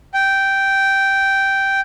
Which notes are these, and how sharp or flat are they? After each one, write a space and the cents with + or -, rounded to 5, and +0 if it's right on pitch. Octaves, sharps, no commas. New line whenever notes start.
G5 -5